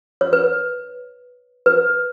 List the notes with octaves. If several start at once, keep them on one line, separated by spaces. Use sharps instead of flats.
C#5
B4
B4